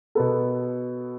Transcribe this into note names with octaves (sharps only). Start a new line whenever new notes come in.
B2 B3 A4